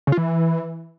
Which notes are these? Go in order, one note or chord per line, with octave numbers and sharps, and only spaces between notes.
C#3
F4
E3